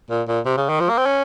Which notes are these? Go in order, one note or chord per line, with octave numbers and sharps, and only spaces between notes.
A#2
A#2
C3
C#3
D#3
F3
A#3
C4
C#4